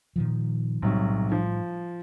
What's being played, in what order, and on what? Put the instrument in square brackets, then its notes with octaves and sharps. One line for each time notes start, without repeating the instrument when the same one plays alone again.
[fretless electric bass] A#2 D#3 F3
[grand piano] B1 C3 F#3 [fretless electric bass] A2 G3
[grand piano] F3